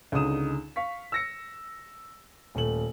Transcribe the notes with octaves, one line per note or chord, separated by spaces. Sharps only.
C#2 D3 D#4 D#6 E7
F5 C#6 B6
E6 A#6 C#7
D#1 A3 F#7